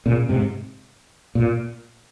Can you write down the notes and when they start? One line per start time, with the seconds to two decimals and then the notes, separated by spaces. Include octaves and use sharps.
0.06 A#2 C#3
0.29 G#2 C3
1.35 A#2